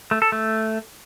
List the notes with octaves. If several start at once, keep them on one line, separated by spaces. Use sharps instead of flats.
A3
A4
A3